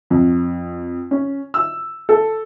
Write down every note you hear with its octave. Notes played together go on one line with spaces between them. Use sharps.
F2
C#4
E6
A4